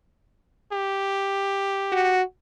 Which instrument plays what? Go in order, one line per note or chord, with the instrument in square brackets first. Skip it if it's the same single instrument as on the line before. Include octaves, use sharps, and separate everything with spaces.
[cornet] G4
[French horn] F#4